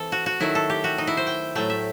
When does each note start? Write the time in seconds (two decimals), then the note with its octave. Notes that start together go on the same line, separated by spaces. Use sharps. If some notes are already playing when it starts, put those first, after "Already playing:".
Already playing: E3 C4 A4
0.12 F#4
0.26 F#4
0.40 D#3 F#3 A3 E4
0.55 A4
0.70 G4
0.84 F#4
0.98 D#4
1.07 E4
1.17 C5
1.27 G5
1.55 A2 F#3 A3 G5
1.70 E5